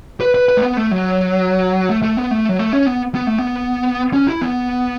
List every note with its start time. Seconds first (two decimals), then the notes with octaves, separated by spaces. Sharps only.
0.21 B4
0.34 B4
0.49 B4
0.57 A3
0.62 B3
0.77 A3
0.91 F#3
1.89 A3
2.03 A3
2.17 B3
2.31 A3
2.49 F#3
2.59 A3
2.73 C#4
2.87 B3
3.15 B3
3.27 A3
3.38 B3
4.13 C#4
4.27 E4
4.41 B3